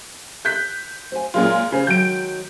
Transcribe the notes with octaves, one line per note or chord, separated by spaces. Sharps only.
F#6 G6 B6
C5 F5 G#5
A#2 F#3 G#3 F4 A#4 D5
C#3 C5 G#5
D#3 F#3 G#3 G6 D7